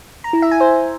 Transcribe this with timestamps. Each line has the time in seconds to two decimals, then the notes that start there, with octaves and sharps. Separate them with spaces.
0.24 A#5
0.33 E4
0.42 E5
0.51 G#5
0.60 C5